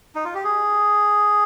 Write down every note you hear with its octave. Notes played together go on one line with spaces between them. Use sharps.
D#4
F4
G4
G#4